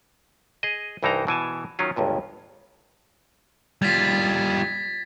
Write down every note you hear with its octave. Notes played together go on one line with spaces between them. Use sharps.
G#4 D#5
C2 G2 E3 D#4 C5 A#5
B2 E3 G#5 A5
D#3 F#3 C#4 F4
G1 C#2 G2 A#2
G3 F4 G#6 A6 B6